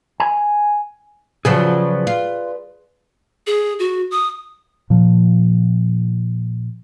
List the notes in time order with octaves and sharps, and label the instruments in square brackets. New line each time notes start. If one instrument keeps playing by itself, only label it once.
[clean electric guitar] G#5
[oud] C#3 F3 F#3 [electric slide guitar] G#4 B4 D5
[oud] F4
[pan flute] G#4
F#4
D#6
[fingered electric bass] A#2 F3